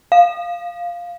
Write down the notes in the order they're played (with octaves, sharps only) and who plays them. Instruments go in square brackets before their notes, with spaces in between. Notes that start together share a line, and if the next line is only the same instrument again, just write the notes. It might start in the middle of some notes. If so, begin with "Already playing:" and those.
[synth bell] F5